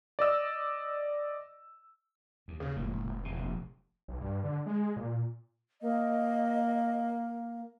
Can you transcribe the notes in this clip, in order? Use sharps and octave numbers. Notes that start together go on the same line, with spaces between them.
D5 D#5 E6
D#2
C#3
F1 C#2 A2 A#3
E2 B2
A#1 C3
B1
G2
D3
G#3
A#2
A#3 D#5